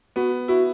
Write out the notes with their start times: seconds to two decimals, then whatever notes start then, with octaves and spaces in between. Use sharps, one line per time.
0.16 B3 F#4
0.48 E4 F#4